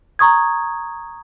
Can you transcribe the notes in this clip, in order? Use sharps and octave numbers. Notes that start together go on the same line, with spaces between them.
A#5 C#6 D#6 G#6